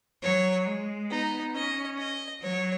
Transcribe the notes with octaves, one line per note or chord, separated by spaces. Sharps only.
F#3 C#5
G#3
B3 D#4
C#4 D#5
D#5
F#3 C#5